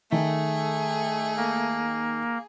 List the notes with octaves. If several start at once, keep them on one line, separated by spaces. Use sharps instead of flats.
D#3 A3 G#4
A#3